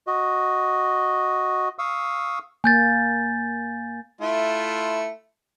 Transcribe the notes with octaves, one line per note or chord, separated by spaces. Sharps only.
F#4 D#5
F5 C#6 D#6 E6
A#3 G#5 G6 A6
A3 E4 F4